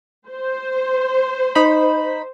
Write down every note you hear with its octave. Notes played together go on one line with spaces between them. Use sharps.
C5
D#4 B5